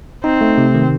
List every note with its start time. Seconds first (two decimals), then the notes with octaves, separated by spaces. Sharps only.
0.24 C4 D#4
0.41 A3
0.58 C3
0.74 D#3